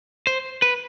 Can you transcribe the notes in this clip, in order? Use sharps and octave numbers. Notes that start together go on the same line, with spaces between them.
C5
B4